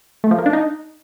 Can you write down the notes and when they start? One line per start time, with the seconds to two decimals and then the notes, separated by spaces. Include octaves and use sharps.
0.24 A3
0.31 F3
0.38 A#3
0.46 D4
0.53 D#4